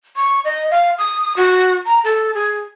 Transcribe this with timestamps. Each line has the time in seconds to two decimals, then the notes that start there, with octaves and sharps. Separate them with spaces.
0.16 C#6
0.45 D#5
0.71 F5
0.98 D#6
1.37 F#4
1.86 A#5
2.04 A4
2.34 G#4